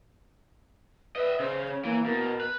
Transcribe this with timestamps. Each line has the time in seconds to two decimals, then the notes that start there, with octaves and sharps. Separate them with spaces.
1.16 B4 D#5 E5
1.40 C#3 C5
1.68 C#5
1.84 E3 A#3
2.06 B2 A#4
2.41 B4